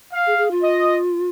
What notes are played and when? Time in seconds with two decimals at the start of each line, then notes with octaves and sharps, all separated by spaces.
0.14 F5
0.27 G#4
0.38 G#4
0.51 F4
0.63 D#5